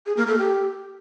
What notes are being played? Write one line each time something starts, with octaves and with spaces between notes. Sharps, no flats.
G#4
A#3
A4
G4